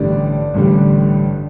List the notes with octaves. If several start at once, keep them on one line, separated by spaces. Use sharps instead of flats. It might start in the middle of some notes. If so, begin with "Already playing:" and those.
Already playing: A1 G2 D3 G3 D4 D5
A1 G2 D3 G3